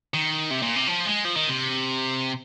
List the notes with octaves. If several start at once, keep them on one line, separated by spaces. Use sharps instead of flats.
D#3
C3
A#2
C3
F3
G#3
F3
D#3
C3